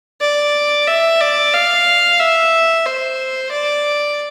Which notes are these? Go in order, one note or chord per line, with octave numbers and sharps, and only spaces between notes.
D5
E5
D5
F5
E5
C5
D5